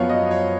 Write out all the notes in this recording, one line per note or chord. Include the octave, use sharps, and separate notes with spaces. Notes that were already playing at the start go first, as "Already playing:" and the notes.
Already playing: F#2 F3 B3 C#5 F5
D#5
C#5